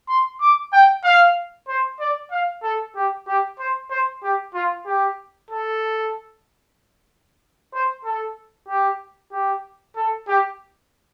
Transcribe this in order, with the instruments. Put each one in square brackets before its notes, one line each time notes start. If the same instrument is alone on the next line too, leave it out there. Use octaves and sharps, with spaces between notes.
[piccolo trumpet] C6
D6
G5
F5
C5
D5
F5
A4
G4
G4
C5
C5
G4
F4
G4
A4
C5
A4
G4
G4
A4
G4